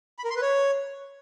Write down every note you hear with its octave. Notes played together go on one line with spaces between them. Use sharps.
B5
A#4
C6
B4
C#5